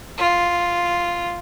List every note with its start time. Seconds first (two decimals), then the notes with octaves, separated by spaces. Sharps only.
0.18 F4